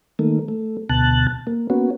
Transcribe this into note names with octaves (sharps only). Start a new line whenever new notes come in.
D#3 A3 A#3
A3
D2 B2 A5 F#6
A#3
A#3 B3 C#4 F#4